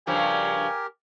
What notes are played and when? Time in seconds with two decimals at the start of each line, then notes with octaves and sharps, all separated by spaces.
0.07 G2 C#3 F3 G4 A#4 G#5